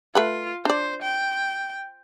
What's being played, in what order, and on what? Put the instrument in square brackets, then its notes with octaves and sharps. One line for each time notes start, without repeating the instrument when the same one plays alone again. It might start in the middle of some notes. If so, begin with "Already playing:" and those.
[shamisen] A3 B4 F#5 [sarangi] F4
[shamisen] D4 D5 [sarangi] C5
[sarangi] G5